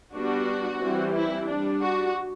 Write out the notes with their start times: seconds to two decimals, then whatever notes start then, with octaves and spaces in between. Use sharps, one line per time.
0.14 G3 B3 D4 F#4
0.80 E3 G3 C4
1.14 E4
1.48 G3 D4
1.81 F#4